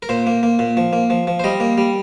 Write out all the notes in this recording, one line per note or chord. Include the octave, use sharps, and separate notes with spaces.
A#4
A#2 C5
A#3
A#3
A#2
F3
A#3
F3
F3
C5
G3 D#5
A#3
G3